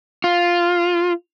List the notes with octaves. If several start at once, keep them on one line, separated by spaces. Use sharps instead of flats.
F4